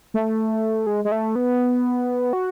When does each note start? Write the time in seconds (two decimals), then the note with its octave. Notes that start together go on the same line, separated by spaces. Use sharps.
0.14 A3
0.87 G#3
1.05 G#3
1.12 A3
1.36 B3
2.33 F#4